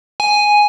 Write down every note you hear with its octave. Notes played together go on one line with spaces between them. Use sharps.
G#5